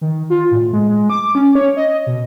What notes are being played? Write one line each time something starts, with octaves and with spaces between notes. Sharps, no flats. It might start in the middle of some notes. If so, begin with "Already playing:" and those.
D#3
F4
A2
G#3
G#3
D6
C#4
C#5
D#5
B2